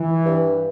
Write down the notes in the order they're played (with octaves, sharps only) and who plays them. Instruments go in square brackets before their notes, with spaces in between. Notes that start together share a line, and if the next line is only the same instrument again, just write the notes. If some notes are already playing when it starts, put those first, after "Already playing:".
Already playing: [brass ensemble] E3
[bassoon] G2